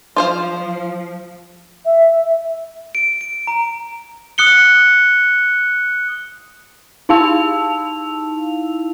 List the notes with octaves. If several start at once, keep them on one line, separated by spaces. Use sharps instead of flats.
F3 F4 C5 F5
E5
D7
D7
A#5
D#6 F#6 C#7 G7
D#4 E4 F5 A5 E6 F7